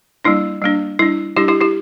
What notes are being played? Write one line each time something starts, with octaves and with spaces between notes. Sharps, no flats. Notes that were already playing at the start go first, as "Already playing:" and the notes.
G3 A#3 D4 E4
G3 A#3 D4
G3 D4 E4
G3 D4 E4 G4
E4 G4
E4 G4